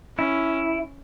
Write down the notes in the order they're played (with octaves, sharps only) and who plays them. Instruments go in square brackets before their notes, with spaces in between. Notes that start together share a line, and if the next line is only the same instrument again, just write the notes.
[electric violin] C#4 [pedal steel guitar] E4